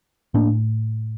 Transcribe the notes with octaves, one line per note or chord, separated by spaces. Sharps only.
A2 A#3 D4